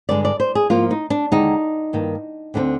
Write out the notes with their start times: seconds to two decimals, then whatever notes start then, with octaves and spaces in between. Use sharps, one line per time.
0.09 G2 D3 G#3 D5
0.25 D5
0.40 C5
0.55 G#4
0.70 G#2 F3 A#3 F4
0.91 D#4
1.10 D4
1.32 D#2 D3 G#3 D#4
1.93 G2 D#3 A#3
2.54 D2 D3 G3 C4